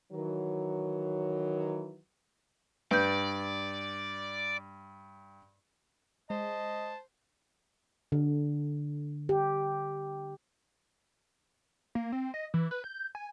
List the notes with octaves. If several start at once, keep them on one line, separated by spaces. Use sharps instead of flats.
D#3 E3 F#3
G2 B4 D5 G6
G#3 C5 D#5 A5
D3
G4
A#3
C4
D#5
E3
B4
G6
G#5